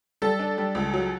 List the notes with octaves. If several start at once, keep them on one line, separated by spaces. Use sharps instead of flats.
G3 A4
D4
G3
C#2
F#3